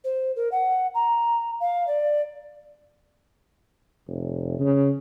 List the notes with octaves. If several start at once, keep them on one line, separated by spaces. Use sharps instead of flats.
C5
A#4
F#5
A#5
F5
D5
F1
C#3